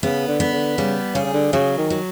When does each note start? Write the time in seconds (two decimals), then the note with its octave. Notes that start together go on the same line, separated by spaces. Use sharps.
0.03 C#3 B3
0.28 D3
0.40 B3
0.53 D3
0.78 C#3 G3
1.15 C#3 G#4
1.25 C#3
1.34 D3
1.53 C#3 F#3
1.78 D#3
1.90 F#3